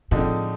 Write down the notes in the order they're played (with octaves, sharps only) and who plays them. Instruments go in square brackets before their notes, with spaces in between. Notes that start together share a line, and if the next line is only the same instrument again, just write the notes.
[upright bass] A2 [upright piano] D3 F3 G#3 C4 D#4